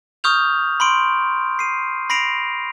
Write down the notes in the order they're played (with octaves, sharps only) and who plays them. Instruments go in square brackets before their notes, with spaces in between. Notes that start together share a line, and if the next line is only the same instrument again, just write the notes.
[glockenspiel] C#6 D#6 F6 G6 F7
B5 C6 D7
C7 D#7
B5 A#6 C7 D7 F7